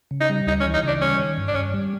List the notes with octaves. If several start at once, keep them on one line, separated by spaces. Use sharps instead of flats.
C#3
D#4
G3
D2 D#4
C#4
E3
D#4
C#3 D4
G3 C#4
D#3
G2
D4
G2 C#4
G3